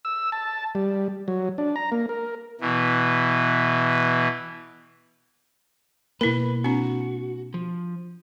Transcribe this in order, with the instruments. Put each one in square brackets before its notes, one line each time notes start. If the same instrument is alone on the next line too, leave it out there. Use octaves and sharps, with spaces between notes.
[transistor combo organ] E6
A5
G3
F#3
D4
A#5
A#3
A#4
[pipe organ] B2 E3
[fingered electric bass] B2 A#3 [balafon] E4 A#4 [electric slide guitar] B4
[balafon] C4 D4 [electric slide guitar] F#4
[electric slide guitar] F3